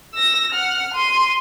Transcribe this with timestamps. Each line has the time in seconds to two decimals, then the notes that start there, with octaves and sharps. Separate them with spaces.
0.14 E6 A#6
0.53 F#5 F6
0.94 C6 D#7